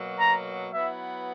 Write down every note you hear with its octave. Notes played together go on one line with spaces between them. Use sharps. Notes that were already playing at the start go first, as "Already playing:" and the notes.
Already playing: B2 F#3 A#3
A#5
F#3 B3 E4 E5